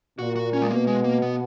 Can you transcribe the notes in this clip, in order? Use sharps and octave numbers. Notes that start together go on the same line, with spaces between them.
A#2 F#4
F#4
C#4
G#3
B2 A#3
G#3
A#3
B3